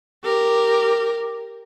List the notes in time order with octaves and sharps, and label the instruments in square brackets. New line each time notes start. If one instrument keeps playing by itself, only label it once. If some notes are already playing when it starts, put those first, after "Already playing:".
[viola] G4 A#4